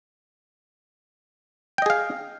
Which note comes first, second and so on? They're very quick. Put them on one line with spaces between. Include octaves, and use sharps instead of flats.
G5 D#5 G#4 F5